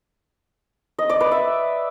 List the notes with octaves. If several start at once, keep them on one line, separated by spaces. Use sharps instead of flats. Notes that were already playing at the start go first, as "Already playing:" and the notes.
D#5
D5
B4
E5